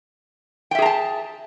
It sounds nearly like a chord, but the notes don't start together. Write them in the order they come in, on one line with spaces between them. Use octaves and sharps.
G5 E5 G#4 A#5 A5